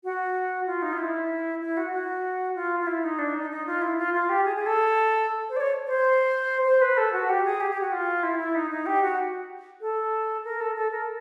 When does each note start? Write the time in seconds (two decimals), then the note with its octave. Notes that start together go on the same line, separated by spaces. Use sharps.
0.04 F#4
0.66 F4
0.82 D#4
0.93 F4
0.98 E4
1.61 E4
1.77 F#4
1.92 F#4
2.55 F4
2.80 F4
2.87 E4
3.04 D#4
3.19 D4
3.35 D#4
3.51 D#4
3.67 F4
3.82 E4
3.98 F4
4.14 F4
4.29 G4
4.45 G#4
4.56 G#4
4.66 A4
5.50 C5
5.56 D5
5.61 C#5
5.87 C5
6.66 C5
6.82 B4
6.98 A4
7.13 F#4
7.30 G4
7.45 G#4
7.60 G4
7.71 G4
7.81 F#4
7.92 F4
8.23 E4
8.39 E4
8.55 D#4
8.71 D#4
8.86 G4
9.03 F#4
9.81 A4
10.45 A#4
10.61 A4
10.76 A4
10.91 A#4